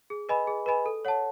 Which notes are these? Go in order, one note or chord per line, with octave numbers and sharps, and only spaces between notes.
G#4
B4 D#5 G#5 B5
G#4
B4 D#5 G#5 B5
A4
C#5 F#5 A5